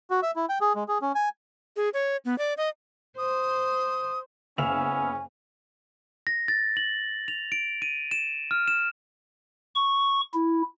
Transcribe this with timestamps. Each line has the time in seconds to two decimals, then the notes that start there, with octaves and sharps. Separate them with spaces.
0.10 F#4
0.23 E5
0.36 E4
0.49 G5
0.61 G#4
0.75 G#3
0.88 G#4
1.02 C#4
1.15 G#5
1.76 G#4
1.94 C#5
2.25 B3
2.38 D5
2.57 D#5
3.18 C5 D#6
4.58 F#1 B3 C#4 E5 F5 G#5 F7
6.27 A#6
6.48 A6
6.77 F#7
7.28 F7
7.52 D7
7.82 D#7
8.11 E7
8.51 F6
8.68 E7
9.75 C#6
10.34 E4